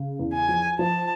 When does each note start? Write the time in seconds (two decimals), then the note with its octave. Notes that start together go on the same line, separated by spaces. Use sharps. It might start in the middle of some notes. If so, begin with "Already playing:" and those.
Already playing: C#3
0.19 E2
0.34 G#5
0.49 F3
0.79 F3 A5